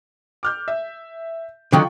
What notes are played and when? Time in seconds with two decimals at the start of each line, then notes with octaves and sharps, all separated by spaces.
0.43 D6 F6 G6
0.68 E5
1.73 D3 D#3 F#3 F4 G5 C#6